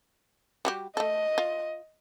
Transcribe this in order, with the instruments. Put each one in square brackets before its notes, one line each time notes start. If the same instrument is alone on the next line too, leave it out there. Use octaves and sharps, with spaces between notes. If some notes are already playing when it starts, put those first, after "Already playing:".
[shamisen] G3 F#4 G4
[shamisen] A3 A4 [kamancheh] D#5
[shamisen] F4